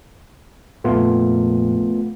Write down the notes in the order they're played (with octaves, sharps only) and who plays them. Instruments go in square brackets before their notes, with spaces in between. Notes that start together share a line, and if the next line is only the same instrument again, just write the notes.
[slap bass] A#1 F2 A#2 [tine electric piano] A3 B3 F4